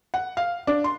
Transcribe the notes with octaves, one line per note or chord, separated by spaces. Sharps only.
F#5
F5
D4
C6